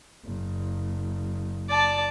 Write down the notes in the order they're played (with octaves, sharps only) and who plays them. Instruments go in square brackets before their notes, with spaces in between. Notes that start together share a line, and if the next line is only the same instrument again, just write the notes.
[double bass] F#1
[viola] D5 A5